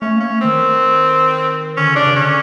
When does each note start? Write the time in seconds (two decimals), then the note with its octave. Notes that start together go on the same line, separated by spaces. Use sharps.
0.02 A3 C#4
0.16 A#3 C#4
0.31 A3
0.41 D#3 C4
1.77 D3 C#4
1.91 C#3 D4
2.06 C#3
2.16 C#4
2.21 D3